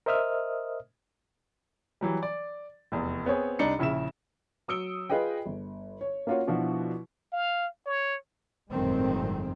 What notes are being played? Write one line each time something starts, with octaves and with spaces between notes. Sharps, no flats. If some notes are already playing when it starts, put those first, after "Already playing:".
A#4 C5 D#5 E5 D#6 F6
E3 F#3 G3
D5
F1 E2
B3 C4 G#4 C#5
C2 D4 D#4 C#7
A#1 C#3 E4 E5 E7
F#3 D#6 E6 C#7 D7 G7
F4 G#4 B4 D#5 G5
G1
C#5
A#3 C#4 F4 F#4 C#5
B2 F3 D4 E4 F#4
F5
C#5
G1 F2 A2 D#3 G#3 C4